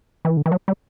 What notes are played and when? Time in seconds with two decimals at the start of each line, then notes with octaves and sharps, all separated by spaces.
0.25 E3
0.37 D3
0.46 E3
0.52 F#3
0.68 G3